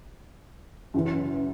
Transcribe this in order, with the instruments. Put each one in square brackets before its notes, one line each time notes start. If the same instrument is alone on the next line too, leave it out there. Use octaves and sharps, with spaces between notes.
[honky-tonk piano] F#2 C#3 E3